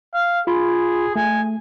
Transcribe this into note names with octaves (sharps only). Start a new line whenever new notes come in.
F5
F4 G#4 B5 C6
A3 G#5